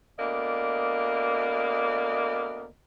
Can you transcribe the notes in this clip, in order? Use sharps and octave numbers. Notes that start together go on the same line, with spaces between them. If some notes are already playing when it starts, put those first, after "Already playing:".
D2 A#3 B3 D5 D#5